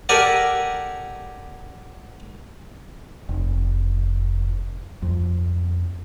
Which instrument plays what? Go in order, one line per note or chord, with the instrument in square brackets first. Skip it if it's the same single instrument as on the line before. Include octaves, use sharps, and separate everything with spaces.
[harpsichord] G4 A4 A#4 D5 F#5 G#5
[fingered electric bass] F1
F2